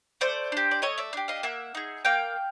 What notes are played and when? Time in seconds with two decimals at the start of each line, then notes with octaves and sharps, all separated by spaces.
0.21 A3 C5 D5
0.52 D4 G4
0.71 D5
0.82 A3 C#5 D#5
0.98 D5 E5
1.13 D4 G4
1.28 D#5 F5
1.43 A#3 E5 F#5
1.75 D#4 G#4
2.05 A#3 F5 G5